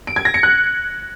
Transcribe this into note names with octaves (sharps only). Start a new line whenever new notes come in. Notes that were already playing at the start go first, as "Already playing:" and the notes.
D7
G#6
A#6
C#7
F#6